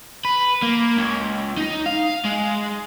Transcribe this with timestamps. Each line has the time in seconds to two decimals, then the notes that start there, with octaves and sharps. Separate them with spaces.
0.25 B4
0.62 A#3
0.98 C#2
1.57 D#4
1.86 F5
2.25 G#3